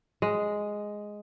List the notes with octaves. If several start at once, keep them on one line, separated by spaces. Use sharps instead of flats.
G#3